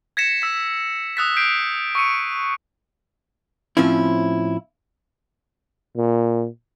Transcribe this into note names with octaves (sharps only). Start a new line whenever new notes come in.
G#6 A#6 B6 C#7 E7
E6 B6
D#6 E6 F#6 A6 B6
G6 B6 C7 D7 D#7
C#6 E6 C#7 D#7
A2 F3 C4 C#4 E4
A#2